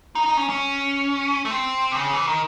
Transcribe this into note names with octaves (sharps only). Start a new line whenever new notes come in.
D#4
D#4
C#4
C#4
A3
C4
C3
C#3
E3
D#3